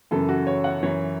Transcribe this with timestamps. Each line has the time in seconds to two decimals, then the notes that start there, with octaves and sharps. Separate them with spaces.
0.11 F#2 C#3 E3 A4
0.29 F#4
0.47 C#5
0.64 F#5
0.83 F#2 E3 C#5